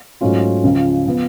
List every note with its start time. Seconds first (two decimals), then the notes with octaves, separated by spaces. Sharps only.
0.21 G#2 F#3 A3 C#4 F4
0.63 C#2 C#3 F3
1.07 F3 B3